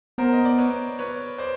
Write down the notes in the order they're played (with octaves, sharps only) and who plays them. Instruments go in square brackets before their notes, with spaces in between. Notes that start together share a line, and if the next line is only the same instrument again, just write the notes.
[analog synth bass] B3 [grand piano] A#4 C5
[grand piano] D#5
D5
B4 C#5
B4 C#5
C5 D5